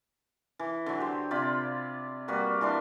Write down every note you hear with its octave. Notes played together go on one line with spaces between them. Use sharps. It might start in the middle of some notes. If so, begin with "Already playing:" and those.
E3
D3 F#3
G4 C5
C3 F4 D5 B5
G3 A#3 F#4 B4
E3 D4 C6 D6